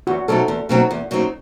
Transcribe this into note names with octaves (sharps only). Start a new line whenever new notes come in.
E2 F#4
B2 F#3 C4 D#4 A4
E2
B2 F#3 C4 D#4
E2
B2 F#3 C4 D#4